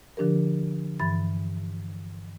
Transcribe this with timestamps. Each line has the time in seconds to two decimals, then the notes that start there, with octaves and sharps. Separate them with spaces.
0.17 D3 F3 D4 G4 A#4
0.99 G2 E3 B5 A6